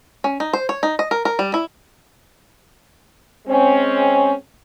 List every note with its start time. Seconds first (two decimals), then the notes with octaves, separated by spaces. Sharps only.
0.24 C#4
0.40 D#4
0.53 C5
0.69 C#5
0.83 D#4
0.99 D#5
1.11 A#4
1.25 A#4
1.39 G3
1.54 E4
3.47 G#3 C4 C#4